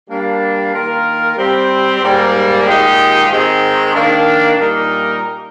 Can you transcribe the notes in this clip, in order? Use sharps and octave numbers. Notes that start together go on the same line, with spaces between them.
G3 A#3 D4
D#3 A#3 F4 A#4
G3 C4 G4
G#2 G3 A#3
A#2 G#3 D#4 G4
G#2 D#3 G#3 C4
D#3 A#3 D4
A#2 G3 A#3 D#4 A#4